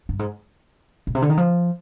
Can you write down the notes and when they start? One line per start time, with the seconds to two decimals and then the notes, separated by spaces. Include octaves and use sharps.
0.09 G2
0.19 G#2
1.07 A#2
1.15 C3
1.22 D3
1.30 D#3
1.37 F3